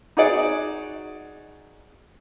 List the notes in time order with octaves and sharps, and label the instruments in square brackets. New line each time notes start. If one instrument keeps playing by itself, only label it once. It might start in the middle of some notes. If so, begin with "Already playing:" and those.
[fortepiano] D#4 F#4 G#4 D5